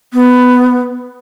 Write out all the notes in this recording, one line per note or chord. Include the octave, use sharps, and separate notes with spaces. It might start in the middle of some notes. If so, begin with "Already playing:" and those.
B3